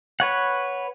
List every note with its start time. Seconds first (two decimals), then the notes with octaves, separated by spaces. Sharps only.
0.20 B4 C#5 F#5